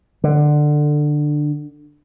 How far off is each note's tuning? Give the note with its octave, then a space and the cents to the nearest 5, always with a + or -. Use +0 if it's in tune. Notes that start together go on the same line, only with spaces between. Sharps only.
D3 +15